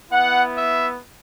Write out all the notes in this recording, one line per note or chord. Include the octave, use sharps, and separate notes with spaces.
B3 E4 F#5
E5